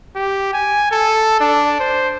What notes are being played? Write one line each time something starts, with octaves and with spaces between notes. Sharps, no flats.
G4
G#5
A4
D4
C5